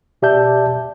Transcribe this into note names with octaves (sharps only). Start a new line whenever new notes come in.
B2 G4 D5 E5 A5 G6